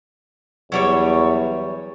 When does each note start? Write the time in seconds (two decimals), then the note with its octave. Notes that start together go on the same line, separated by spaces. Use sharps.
0.72 E2 F#3 G3 C#5